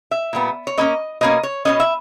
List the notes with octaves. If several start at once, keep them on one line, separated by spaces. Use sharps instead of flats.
E5
A#2 G3 B3
C#5
B2 A#3 C#4 D#5
B2 A#3 C#4 D#5
C#5
B2 A#3 C#4 D#5
E5